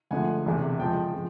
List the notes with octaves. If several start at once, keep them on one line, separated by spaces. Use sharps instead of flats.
D2 D3 F3 G#3 F#5 G#5
E1 E2 C3
E2 C#3 F3 G#3 G5 A5
F3